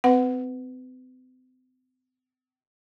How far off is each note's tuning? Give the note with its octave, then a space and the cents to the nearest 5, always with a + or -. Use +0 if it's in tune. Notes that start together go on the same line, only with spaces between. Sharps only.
C4 -40 B4 +20 F#5 +0